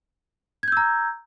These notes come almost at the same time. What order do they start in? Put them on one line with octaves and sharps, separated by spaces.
G#6 G6 E6 A#5